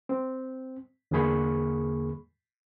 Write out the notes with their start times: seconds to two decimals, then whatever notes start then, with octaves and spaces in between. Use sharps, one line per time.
0.09 C4
1.11 E2 D3 A#3 G#4 B5 C#6